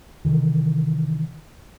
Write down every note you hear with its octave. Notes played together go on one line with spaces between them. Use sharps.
C3 D#3 E3